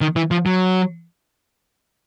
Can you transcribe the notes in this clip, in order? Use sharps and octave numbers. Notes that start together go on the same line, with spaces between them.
D#3
E3
F3
F#3